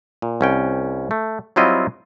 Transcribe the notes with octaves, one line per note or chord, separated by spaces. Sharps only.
A#2
C2 C#4 G5
A3
F#3 G3 C4 E4 F4 D#5